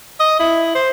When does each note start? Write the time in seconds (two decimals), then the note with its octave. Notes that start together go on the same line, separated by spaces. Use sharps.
0.20 D#5
0.40 E4
0.75 C5